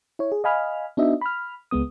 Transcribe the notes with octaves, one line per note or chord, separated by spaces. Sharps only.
E4 C#5
G#4
D#5 F5 G#5 B5 F6
B3 D4 D#4 F#4 D#5 E5
B5 F6
C#2 G#3 B3 D#6